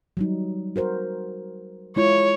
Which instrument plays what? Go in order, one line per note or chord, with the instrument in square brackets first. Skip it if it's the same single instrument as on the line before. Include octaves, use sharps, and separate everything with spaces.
[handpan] F#3 G3 D#4
F#4 A#4 C5
[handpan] G#3 E4 F4 [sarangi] C#5